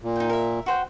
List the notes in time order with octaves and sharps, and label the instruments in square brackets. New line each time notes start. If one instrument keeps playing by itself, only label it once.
[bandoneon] A#2
[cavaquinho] D#4 G5
A#4 E5
F#4 C5 G5